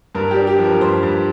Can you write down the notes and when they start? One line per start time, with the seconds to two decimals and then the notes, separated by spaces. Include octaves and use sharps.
0.15 G2 A#4
0.31 G4
0.36 D4
0.47 G4
0.59 F3
0.64 A#4
0.81 G2 C5
1.03 G2